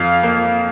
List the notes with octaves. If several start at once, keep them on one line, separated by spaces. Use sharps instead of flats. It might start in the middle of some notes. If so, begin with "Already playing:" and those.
Already playing: F2 F5
A#3